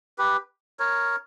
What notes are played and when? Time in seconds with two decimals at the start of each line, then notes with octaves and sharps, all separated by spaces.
0.18 G4 B4
0.79 A#4 C#5